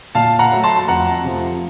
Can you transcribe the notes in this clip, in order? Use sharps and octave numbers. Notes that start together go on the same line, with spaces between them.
A#2 F5 A5
F#5 A#5
F#3 A3
A5 C6
A5
F2 F#5 A#5
C3 F3 A3